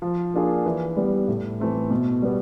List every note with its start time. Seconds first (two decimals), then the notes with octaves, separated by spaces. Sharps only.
0.02 F3
0.34 A#3 D4 F4 G#4
0.66 E3
0.97 G3 B3
1.28 A2
1.60 E3 A3 C4
1.91 B2
2.22 G3 B3